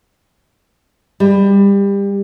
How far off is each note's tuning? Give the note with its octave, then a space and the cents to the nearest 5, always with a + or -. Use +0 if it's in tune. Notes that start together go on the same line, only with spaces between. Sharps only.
G3 +25